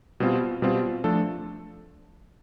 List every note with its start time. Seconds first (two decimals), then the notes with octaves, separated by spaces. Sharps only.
0.20 B2 G3 C4 F4
0.62 B2 G3 C4 F4
1.04 F3 A3 D4 A4